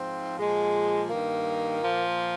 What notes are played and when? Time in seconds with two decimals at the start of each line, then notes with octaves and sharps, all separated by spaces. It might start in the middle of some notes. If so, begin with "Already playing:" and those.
Already playing: G#2 F3 C4
0.38 A#2 F3 G#3
1.09 G2 D#3 A#3
1.79 A#2 F3